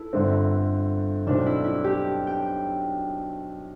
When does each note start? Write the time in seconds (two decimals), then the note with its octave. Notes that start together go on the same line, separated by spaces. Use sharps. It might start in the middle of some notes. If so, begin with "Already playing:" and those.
Already playing: E4 A4 B4
0.13 G1 G2 D3 A3 C4
1.27 B1 B2 A3 C4 D4
1.46 E4
1.64 E4
1.84 G4
2.27 G5